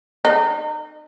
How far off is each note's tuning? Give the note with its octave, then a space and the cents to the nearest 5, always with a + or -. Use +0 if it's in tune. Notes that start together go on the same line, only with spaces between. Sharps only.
D#4 -35